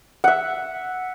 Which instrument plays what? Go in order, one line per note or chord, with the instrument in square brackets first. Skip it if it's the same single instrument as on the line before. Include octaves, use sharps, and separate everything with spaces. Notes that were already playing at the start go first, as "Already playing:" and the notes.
[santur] E5 F#5